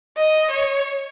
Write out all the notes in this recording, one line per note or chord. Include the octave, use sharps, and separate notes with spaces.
D#5
C#5